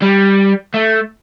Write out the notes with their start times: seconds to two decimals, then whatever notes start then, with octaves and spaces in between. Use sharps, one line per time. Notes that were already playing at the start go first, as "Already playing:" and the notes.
0.02 G3
0.74 A3